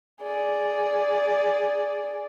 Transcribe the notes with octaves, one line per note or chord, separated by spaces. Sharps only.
G#4 D5